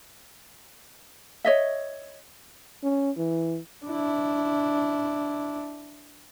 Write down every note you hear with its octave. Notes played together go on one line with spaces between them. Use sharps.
C#5 D#5 E5
C#4
E3
D4 E4